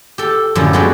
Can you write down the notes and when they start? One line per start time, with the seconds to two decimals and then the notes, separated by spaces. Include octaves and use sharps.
0.18 G4 A4
0.55 F#2 A2 D3 F3 G4
0.73 G#3 B3 F#4 G4 B4 D5